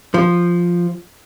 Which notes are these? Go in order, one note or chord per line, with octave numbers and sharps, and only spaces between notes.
F3